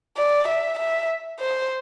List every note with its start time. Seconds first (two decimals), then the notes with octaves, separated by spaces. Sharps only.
0.18 D5
0.48 E5
0.79 E5
1.40 C5